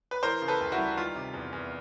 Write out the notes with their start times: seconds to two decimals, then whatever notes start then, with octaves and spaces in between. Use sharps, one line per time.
0.11 B4
0.23 E3 A#4 C5
0.42 C#3
0.48 A4 B4
0.61 D2
0.72 E4 F#4
0.78 G3
0.97 D#3 F4
1.16 C3
1.34 E2
1.53 E2